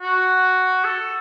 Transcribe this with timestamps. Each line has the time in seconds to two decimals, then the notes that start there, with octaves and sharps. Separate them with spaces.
0.02 F#4
0.85 A4